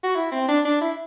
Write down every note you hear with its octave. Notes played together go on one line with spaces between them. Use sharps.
F#4
E4
C4
D4
D4
E4